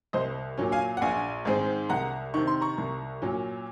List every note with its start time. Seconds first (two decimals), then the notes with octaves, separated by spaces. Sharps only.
0.13 C2 C5 D#5
0.57 A#2 F#3 C#4
0.72 F5 G#5
0.97 F#5
1.01 A#1 F5 G#5
1.45 G#2 D#3 G#3 C4
1.89 C2 F#5 A#5
2.34 C3 D#3 C#6
2.47 C6
2.61 A#5 C#6
2.78 C2
3.22 A#2 F#3 C#4